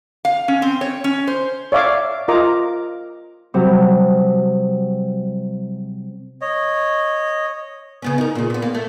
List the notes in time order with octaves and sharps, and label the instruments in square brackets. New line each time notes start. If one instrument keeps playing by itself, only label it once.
[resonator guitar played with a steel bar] F5
C#4
C4
C#5
C#4
C5
[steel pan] C#5 D5 E5 F5 D6
F4 A#4 D#5 A#5 D6
[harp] C3 F#3 G3
[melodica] C#5 D#5
[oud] C#3 B3 C#4
D#4 A#4
A#2 C#3
A#2 B3
A#3
A3